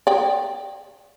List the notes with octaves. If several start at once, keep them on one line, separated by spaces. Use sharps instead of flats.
D5 G5